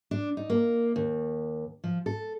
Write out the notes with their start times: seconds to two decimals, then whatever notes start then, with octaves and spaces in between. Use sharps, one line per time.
0.11 D4
0.37 D#4
0.50 A#3
0.96 D#2
1.84 F3
2.06 A4